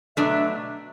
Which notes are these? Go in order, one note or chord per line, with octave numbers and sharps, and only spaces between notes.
B2 F#3 A3 D4 E5